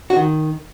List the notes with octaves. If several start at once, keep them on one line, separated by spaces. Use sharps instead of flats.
F#4
D#3